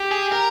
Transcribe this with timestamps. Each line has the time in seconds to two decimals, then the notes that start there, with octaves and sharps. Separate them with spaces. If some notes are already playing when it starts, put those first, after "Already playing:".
Already playing: G4
0.12 G#4
0.32 A#4